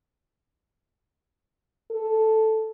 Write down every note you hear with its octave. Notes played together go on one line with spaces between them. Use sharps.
A4